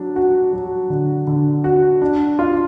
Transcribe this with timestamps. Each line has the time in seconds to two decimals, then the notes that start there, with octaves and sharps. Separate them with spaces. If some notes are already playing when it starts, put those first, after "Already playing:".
Already playing: F#3 D4
0.16 F#4
0.53 F#3
0.90 D3
1.27 D3
1.64 F#4
2.02 D4
2.39 F4